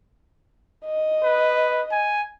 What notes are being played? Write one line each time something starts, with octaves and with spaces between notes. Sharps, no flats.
D#5
B4
G#5